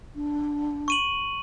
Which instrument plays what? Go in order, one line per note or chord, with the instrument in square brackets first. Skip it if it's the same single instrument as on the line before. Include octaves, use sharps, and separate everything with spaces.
[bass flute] D4
[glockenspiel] C#6 D#7 F#7